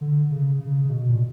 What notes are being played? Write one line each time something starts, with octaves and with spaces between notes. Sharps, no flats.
D3
C#3
C#3
C#3
B2
A#2